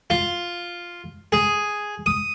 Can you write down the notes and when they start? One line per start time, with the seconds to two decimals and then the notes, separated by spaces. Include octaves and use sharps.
0.10 F4
1.32 G#4
2.06 D#6